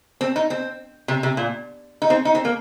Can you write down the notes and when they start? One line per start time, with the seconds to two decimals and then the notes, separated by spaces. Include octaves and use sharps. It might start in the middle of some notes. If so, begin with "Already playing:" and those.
0.21 C4
0.36 D#4
0.50 C4
1.08 C3
1.23 C3
1.37 A#2
2.02 D#4
2.10 C4
2.25 D#4
2.35 C4
2.45 A#3